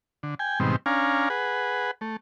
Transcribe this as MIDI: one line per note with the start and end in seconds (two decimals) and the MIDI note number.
0.23 0.35 50
0.39 0.59 79
0.39 0.59 80
0.60 0.76 44
0.60 0.76 47
0.60 0.76 51
0.60 0.76 55
0.60 0.76 60
0.86 1.29 61
0.86 1.29 62
0.86 1.29 77
0.86 1.29 80
0.86 1.29 82
1.30 1.91 68
1.30 1.91 71
1.30 1.91 78
2.01 2.17 57